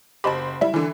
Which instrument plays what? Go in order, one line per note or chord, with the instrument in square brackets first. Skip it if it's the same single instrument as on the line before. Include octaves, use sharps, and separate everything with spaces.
[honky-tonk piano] F#1 C5 B5 [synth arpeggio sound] G4 D#5 A5
[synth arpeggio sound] G3 E5 [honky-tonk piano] E4
[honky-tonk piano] D3 E3